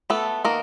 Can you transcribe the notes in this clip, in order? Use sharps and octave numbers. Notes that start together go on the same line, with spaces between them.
A3 B3 A4
D#3 A#3 A#4